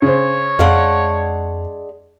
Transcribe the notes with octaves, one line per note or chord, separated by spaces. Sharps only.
C#3 C5 C#5
F2 G#3 D4 F5 F#5